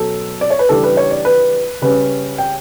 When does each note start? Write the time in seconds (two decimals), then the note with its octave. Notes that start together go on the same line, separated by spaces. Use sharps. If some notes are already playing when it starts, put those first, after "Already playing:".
Already playing: B2 F#3 C#4 A4
0.41 D5
0.50 C#5
0.59 B4
0.69 C#3 E3 G3 D4 A4
0.84 B4
0.97 C#5
1.11 D5
1.25 B4
1.82 C#3 G3 C#4 B4
2.38 G5